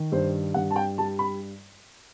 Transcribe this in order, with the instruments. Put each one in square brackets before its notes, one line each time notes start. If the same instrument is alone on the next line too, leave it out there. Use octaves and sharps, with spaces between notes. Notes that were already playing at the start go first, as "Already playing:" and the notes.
Already playing: [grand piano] D#3
G2 C5
G2 F#5
A5
G5
G3 A5
B5